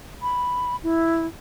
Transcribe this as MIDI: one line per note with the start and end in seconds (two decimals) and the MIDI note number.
0.22 0.76 83
0.83 1.27 64